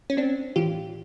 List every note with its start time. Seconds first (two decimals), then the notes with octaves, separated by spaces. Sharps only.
0.10 C#4
0.17 C4 D4
0.56 A2 E3 F4 G4